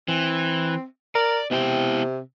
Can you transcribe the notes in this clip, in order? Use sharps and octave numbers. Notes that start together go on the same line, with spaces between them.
E3 C4
A#4 D5
C3 B3 E4 G5